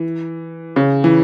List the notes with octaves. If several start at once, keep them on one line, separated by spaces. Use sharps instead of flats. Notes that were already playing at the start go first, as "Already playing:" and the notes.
Already playing: E3
C#3
E3